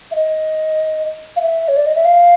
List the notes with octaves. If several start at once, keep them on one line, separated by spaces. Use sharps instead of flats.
E5
D#5
F5
E5
C#5
D5
D#5
E5
F5